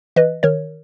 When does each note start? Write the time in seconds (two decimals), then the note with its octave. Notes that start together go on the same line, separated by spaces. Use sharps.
0.16 E3 B4 D#5
0.43 D#3 A#4 C#5